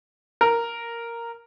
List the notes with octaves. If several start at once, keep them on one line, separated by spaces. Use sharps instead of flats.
A#4